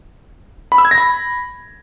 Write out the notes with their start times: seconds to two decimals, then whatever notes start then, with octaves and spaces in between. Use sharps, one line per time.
0.72 B5
0.78 E6
0.85 G#6
0.91 A#6
0.98 B5